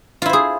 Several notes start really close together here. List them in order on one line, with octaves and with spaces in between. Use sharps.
F4 E4 C5 G#4